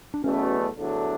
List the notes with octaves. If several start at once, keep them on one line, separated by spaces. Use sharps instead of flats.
D4
E2 B2 F#3 A3 C#4
E2 D3 F#3 A3 D4